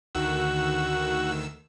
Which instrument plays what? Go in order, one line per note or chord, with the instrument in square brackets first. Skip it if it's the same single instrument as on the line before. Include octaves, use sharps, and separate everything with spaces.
[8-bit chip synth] D2 D#3 E6 [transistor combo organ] F#4